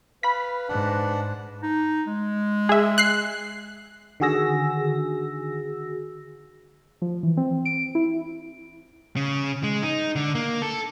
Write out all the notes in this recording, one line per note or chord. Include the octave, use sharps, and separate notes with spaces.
B4 F5 B5 B6
G#2 D4 F#5
D#4
G#3
G#4 E5
F#6 C7
D3 D#3 F#4 G#4 E6 A#6
F3
E3
C4
D7
E4
C#3
G#3
D#4
D3
A#3
A4